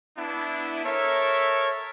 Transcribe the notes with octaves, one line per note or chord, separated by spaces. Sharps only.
B3 D4 E4
A4 A#4 C#5 E5